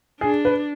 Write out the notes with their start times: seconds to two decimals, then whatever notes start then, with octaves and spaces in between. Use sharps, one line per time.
0.21 D4 G#4
0.45 B4